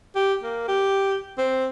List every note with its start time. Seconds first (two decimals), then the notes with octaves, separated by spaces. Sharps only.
0.15 G4
0.43 A#3
0.67 G4
1.38 C4